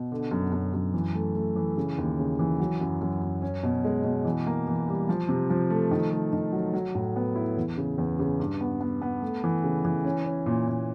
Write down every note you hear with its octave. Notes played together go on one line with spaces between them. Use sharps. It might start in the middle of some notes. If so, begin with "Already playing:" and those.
Already playing: B2
D3
F#2
F#2
F#2
E3
A3
A3
E3
C#3
D#2
C#3
E3
F#3
F#2
F#2
F#2
C#4
B2
G#3
B2
E3
A#3
E3
G3
F3
C3
F3
A3
D#3
A3
D#3
F#3
F#3
A2
B3
E4
E2
C#3
E2
C#3
G2
B3
B3
B3
A3
E3
C#3
E3
C#4
C#4
A#2
A#2